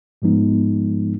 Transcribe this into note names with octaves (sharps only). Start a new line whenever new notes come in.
G#2 F3 G#3 B3 D#4